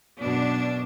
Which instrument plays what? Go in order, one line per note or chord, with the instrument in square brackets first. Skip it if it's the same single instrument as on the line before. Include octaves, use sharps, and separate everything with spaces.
[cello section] F#2 B2 D4